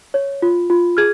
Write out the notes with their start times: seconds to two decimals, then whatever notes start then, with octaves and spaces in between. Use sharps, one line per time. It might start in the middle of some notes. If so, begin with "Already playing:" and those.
0.14 C#5
0.42 F4
0.70 F4
0.97 G#4 F6 G#6